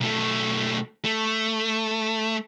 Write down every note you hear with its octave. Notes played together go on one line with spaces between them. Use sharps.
B1 A3
A3